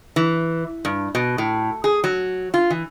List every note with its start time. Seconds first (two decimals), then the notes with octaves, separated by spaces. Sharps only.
0.16 E3
0.85 G2
1.15 B2
1.38 A2
1.84 G#4
2.04 F#3
2.54 F4
2.70 E3